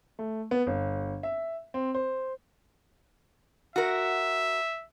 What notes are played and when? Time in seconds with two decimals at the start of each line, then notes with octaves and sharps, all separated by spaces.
0.19 A3
0.51 B3
0.67 G1
1.23 E5
1.74 C4
1.95 C5
3.76 F#4 A#4 E5